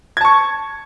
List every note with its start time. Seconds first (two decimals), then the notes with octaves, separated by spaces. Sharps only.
0.17 G#6
0.21 A5
0.25 C#6